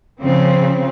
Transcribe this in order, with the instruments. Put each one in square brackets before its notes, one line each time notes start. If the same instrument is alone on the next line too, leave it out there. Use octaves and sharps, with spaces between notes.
[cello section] C#3 F3 C4